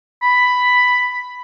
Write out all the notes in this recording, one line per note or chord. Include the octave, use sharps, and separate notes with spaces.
B5